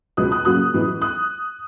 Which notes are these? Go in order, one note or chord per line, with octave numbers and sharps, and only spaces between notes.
C#2 B2 G#3 B3 D#6 F#6
D#6 F#6
F#2 C#3 F#3 A#3 D#6 F#6
F#2 E3 G#3 B3
D#6 F#6